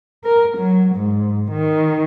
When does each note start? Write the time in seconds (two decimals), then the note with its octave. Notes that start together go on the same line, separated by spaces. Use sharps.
0.24 A#4
0.58 F#3
0.96 G#2
1.52 D#3